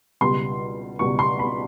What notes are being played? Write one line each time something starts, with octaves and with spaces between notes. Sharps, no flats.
C#2 B2 G3 C6
C#2 B2 G3 C#6
C6
B5